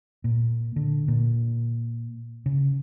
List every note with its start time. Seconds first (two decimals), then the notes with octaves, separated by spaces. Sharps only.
0.24 A#2
0.76 D3
1.08 A#2
2.46 C#3